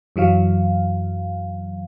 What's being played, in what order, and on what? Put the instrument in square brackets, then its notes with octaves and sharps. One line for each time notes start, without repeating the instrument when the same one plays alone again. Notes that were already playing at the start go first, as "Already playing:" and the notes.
[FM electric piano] F#2 E3 F#3 F5